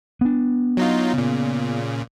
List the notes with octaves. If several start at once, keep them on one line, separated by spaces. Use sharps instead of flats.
B3 D4
F#3 D#4 F4
A#2 C#3